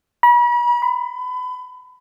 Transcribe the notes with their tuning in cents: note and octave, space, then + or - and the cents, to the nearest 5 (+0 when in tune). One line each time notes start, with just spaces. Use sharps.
B5 -40
B5 +30